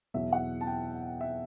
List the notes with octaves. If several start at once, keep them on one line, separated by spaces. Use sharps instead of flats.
E2 B2 F#3 E5
F#5
A5
G5
E5